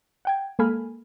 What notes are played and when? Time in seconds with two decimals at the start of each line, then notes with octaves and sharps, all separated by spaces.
0.25 F#5 G5 G#6
0.59 G#3 A#3 A4 G#5 B5 F6